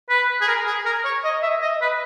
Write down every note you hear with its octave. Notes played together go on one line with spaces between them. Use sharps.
B4
G#4
A#4
G#4
A#4
C#5
D#5
E5
D#5
B4